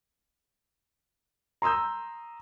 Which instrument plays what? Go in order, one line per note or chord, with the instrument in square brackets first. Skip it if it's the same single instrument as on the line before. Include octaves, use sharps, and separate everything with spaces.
[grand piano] A#5 C6 D#6 E6 G6